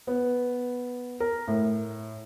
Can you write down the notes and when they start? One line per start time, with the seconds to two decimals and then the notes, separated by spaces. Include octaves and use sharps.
0.07 B3
1.20 A#4
1.48 A2